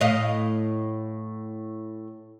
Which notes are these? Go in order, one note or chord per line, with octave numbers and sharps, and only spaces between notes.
A2 D#5 F5